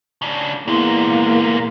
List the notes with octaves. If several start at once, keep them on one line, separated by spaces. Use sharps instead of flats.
C#3 D4
E2 A#2 G#3 A#3